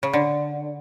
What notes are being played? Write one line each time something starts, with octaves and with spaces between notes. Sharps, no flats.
C#3
D3